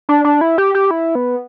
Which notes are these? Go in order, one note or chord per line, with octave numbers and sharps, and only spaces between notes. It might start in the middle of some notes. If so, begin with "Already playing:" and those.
D4
D4
E4
G4
G4
E4
B3